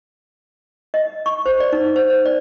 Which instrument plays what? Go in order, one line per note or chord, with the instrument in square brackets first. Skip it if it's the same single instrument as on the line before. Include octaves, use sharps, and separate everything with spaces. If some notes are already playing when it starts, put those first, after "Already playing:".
[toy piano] D#5
C#6
C5
D5
D#4
C5
C5
D5